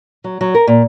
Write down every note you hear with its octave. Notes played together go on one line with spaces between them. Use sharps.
F#3
F#3
A#4
A#2